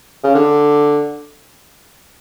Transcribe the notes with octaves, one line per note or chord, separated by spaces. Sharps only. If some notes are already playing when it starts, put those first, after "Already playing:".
C#3
D3